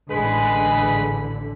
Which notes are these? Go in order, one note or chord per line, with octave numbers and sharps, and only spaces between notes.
A1 D3 G#3 G#4 B4 B5